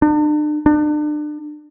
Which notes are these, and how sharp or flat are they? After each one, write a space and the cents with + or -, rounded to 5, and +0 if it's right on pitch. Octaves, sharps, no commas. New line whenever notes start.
D4 +40
D4 +35